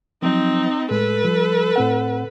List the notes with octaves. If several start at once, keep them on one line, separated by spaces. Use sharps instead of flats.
F3 F#3 C4 D#4
A2 G#3 A4 B4
F3 G3
A2 C4 F#5